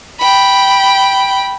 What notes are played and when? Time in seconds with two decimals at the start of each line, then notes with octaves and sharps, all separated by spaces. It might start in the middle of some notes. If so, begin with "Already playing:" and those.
0.20 G5 B5